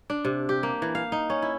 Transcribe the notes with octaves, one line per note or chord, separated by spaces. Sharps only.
D4
C3
G4
A#3
E3
F5
D#4
C#4
E4